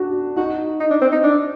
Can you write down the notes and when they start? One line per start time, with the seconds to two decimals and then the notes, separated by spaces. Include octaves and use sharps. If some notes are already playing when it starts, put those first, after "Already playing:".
Already playing: D4 F#4
0.36 D#4 F#4
0.80 D#4
0.91 D4
1.02 C4
1.12 D#4
1.24 D4